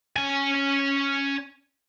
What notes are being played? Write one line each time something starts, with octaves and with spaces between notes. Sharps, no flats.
C#4 G#5